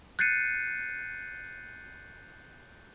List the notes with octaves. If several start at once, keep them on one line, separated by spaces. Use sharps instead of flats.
F#6 G6 A6 C7 C#7 D#7